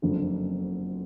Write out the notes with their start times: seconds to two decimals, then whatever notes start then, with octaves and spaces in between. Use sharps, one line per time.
0.02 F#1 F2 D3